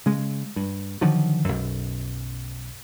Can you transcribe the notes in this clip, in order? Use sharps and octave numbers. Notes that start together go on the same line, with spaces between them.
C#3 G#3
G2
D3 D#3 F3 F#3
B1 F#2